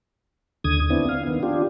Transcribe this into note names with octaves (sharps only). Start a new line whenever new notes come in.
D#2 D3 D#6 G#6
B3 C4 D4 E4
F5
D#3 B3
D4 F4 G4